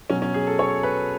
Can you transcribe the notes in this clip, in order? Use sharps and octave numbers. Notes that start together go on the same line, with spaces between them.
B2 F#3 C#4
C#4
G#4
A4
C#5
B4